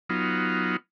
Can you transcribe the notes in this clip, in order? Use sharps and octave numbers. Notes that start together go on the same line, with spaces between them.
F#3 B3 D#4 F4